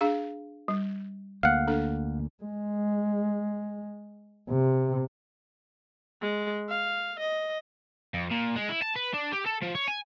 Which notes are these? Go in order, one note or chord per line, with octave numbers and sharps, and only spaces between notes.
D4 G#4 F5
G3
D2 A#3 F5 F#5
D4 A4
G#3
C3
G#3
F5
D#5
F2
A#2
G#3
E4
A5
B4
D4
G4
A4
F3
C#5
G#5